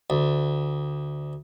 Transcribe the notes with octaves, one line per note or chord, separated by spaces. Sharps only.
D2